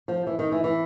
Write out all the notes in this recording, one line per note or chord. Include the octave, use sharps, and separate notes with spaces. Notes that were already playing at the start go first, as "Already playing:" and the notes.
F3
E3
D#3
E3
E3